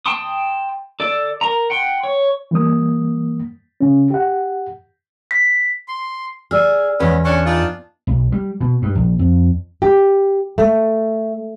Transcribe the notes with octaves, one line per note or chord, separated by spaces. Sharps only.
G5 A5 C6 D#6
A4 D5
A#4 A#5
F#5 G5 C6
C#5
E3 G3 A#3 D#6
C#3 C#4
G4 F#5
B6
C6
G#4 D5 E6 F6
E2 G#3 B3 C#4
C#4 D4 G#5 C#7
D4 D#4 F4
B1
G3
B2
G2
A#1
F2
G4
A3